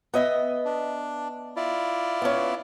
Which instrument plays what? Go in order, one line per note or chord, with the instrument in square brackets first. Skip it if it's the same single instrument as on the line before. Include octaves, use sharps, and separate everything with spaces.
[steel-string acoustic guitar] B3 D#5 E5
[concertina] D4
E4 F4 D5
[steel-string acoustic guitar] B3 C#4